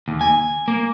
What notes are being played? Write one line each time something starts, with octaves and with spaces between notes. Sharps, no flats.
D#2
G#5
A#3